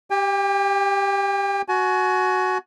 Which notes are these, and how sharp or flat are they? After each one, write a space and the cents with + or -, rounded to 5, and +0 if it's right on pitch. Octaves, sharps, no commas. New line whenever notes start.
G4 +0 G5 +40
F#4 +0 G#5 +35